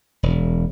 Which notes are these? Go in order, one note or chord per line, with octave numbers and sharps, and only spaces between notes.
E1